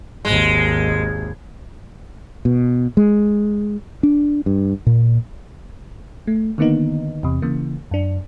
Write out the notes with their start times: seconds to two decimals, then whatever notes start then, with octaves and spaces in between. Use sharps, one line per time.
0.25 G#1 D#2 G#3
2.45 B2
2.97 G#3
4.03 D4
4.46 G2
4.87 A#2
6.27 A3
6.58 D3 D#3 A#3 B3 D#4
7.23 E2 C3
7.42 C#3 E3 A#3
7.91 F#2 D4